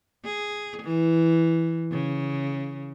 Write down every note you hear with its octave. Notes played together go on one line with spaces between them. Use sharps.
G#4
E3
C#3